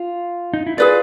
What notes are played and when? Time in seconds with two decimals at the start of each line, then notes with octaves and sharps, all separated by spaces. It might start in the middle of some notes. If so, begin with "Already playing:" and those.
Already playing: F4
0.54 D#4
0.67 E4
0.77 F4 G#4 B4 D5